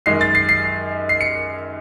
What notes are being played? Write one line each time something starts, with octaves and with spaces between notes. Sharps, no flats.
F#2 D#3 G#3 C7
A6
C7
C7
C7
C#7